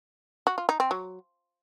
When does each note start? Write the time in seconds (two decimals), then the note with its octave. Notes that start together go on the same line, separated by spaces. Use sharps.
0.47 F#4
0.58 F4
0.69 D#4
0.80 C4
0.91 F#3